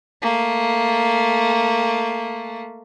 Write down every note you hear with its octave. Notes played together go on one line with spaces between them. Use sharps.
A3 A#3